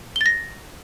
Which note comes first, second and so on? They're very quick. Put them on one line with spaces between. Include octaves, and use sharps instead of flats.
G7 A6 A#6